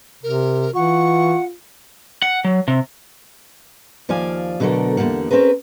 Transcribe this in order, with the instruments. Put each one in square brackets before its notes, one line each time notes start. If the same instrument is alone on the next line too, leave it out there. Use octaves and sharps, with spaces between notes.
[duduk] C3 [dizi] A#4
[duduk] E3 [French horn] F4 [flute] F#5 [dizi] C#6
[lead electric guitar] F#5
F#3
C3
[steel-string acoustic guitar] D#2 F3 D5 F5 G#5
B2 D3 F#3 A3 A4 A#4
E2 D3 D#3 G3 A#3 F#5
C4 C#4 G#4 A#4 B4